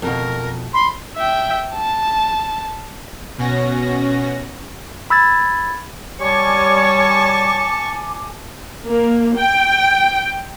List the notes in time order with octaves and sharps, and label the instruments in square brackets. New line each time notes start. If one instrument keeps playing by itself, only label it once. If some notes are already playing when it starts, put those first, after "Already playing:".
[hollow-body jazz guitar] F2 B2 [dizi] A#4
[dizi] B5 [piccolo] C6
[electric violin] E5 G5
A5
[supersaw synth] B2 C#4 F#4 A#6
[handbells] B5 E6 G#6 A6
[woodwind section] G3 C#5 [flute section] G#5 D6 [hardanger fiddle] A5 C#6
[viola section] A#3
G5